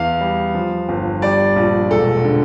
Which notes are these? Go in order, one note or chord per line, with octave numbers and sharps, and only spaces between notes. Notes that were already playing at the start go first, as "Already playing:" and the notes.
Already playing: E2 E3 F5
G3
F3
G1
G3 D5
A#1
E1 A4
D3